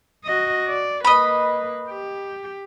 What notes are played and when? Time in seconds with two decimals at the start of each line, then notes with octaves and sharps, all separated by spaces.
0.25 F#4 D#5
0.68 D5
1.05 A#3 B4 D#5 B5
1.89 G4